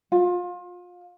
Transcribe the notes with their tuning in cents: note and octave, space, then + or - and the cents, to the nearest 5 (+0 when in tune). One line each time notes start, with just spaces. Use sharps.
F4 +30